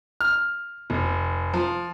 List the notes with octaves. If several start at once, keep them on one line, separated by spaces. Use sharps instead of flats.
F6
F1
F3